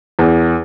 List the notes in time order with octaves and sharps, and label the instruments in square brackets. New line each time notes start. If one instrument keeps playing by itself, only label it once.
[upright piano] E2